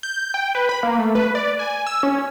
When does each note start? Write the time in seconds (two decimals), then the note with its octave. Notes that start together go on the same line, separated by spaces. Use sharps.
0.03 G6
0.34 G5
0.55 B4
0.69 B5
0.83 A#3
0.99 A3
1.15 B4
1.35 D5
1.59 G#5
1.87 E6
2.03 C#4